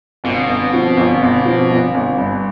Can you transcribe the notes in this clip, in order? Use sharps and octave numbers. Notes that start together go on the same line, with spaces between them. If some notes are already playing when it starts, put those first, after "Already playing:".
G1 B2
G1
F3
G1
G1
F3
G1
G1
G2